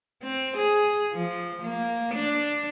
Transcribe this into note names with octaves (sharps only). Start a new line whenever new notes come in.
C4
G#4
F3
A#3
D4